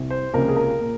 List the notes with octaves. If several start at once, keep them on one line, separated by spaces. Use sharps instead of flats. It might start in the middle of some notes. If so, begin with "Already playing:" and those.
Already playing: C2 C3
C5
C#2 C3 F3 A#3 C#4 A#4
G#4
A#4
A#2